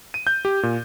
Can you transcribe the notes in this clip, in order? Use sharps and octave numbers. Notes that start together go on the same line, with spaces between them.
D#7
G6
G4
A#2